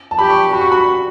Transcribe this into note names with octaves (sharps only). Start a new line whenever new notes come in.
A5
G4 B5
C#6
F#4 B5
C#6
B5
C#6